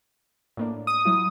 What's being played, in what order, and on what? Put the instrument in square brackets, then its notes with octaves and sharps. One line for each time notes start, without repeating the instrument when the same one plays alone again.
[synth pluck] A2 A#3 D4
[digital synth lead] D#6
[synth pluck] F#3 E4